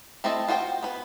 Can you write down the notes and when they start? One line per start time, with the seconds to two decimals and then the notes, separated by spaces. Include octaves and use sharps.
0.24 A3 C4 E4 A4 D#5
0.48 F4 F#4 C5 D#5 G5
0.83 B3 B4